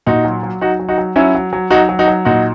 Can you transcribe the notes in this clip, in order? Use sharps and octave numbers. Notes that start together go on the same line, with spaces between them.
A#2 D#4 F#4
F#3
F#3
F#3 D#4 F#4
F#3
D#4 F#4
F#3
F#3 C#4 E4
F#3
F#3
F#3 D#4 F#4
F#3
D#4 F#4
F#3
A#2 D#4 F#4